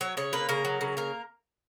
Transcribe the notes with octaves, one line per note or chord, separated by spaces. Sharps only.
F#3 C#5
C#3 C#5
A#3 B4
C#3 A#4
F#3
C#3
A#3 A#4